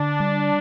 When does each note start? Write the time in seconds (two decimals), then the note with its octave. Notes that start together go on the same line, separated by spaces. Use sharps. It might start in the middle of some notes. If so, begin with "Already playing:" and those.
Already playing: D3 D4
0.20 G3